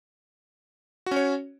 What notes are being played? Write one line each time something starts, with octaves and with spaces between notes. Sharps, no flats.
C#4 F#4 C#5